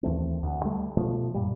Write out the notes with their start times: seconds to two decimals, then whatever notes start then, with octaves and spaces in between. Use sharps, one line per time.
0.03 D#2 E3 A3 C4
0.43 D2
0.65 G3 A3
0.97 B2 F3 A3
1.34 F#2 A#2 G3